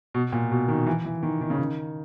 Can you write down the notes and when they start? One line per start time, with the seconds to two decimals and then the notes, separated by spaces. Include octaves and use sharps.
0.14 B2
0.33 A#2
0.52 B2
0.68 D#3
0.86 E3
1.05 E3
1.23 D#3
1.41 D#3
1.50 C#3
1.59 D#3